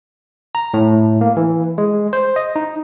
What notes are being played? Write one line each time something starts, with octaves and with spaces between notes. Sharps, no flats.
A#5
A2
A#3
E3
G#3
C5
D#5
D#4